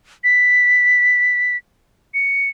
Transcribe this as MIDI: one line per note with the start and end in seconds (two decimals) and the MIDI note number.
0.24 1.56 95
2.14 2.49 97